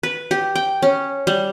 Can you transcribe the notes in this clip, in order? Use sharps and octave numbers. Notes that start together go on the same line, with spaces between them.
B4
G4
G5
C#4
G3